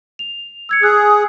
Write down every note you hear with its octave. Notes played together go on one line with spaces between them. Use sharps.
F7
E6 G#6 C#7
G#4 E6 F#6